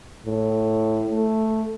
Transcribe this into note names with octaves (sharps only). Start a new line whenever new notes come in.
A2
A3